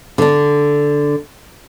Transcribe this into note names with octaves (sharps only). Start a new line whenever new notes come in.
D3 D4